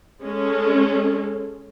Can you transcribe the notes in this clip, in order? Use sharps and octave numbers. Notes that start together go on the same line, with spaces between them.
G#3 C#4 A4